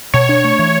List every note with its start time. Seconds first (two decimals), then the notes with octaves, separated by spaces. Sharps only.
0.14 B2 C#5
0.29 D4
0.44 A3
0.59 E3